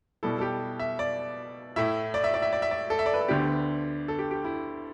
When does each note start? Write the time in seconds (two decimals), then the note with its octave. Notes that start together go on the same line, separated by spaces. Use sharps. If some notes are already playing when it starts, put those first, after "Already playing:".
0.23 B2 G3 E4 A4
0.38 A4
0.41 G4
0.79 E5
0.99 D5
1.76 A2 A3 E4 E5
2.14 D5
2.24 E5
2.34 D5
2.42 E5
2.53 D5
2.62 E5
2.71 D5
2.90 A4
2.99 E5
3.06 D5
3.14 B4
3.21 A4
3.28 D2 D3 B3 D4 G4
4.08 A4
4.19 G4
4.31 G4
4.44 E4